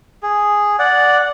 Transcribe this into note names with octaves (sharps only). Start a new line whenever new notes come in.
G#4
D5 F#5